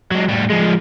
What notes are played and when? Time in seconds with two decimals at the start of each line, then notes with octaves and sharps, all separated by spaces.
0.11 F#3 G#3
0.29 A2 G3
0.50 F3 G#3